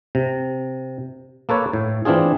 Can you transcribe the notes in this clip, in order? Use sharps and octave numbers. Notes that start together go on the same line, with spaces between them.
C3
A#3 A4 B4 C#5
A2
E3 C4 D4 F4 G#4